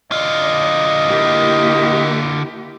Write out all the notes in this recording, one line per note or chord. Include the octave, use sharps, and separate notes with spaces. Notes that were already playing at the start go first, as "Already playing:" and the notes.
D3 F4 D5 D#5
A#3 E4 G4